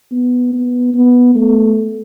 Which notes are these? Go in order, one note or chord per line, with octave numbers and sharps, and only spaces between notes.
B3
B3
B3
A3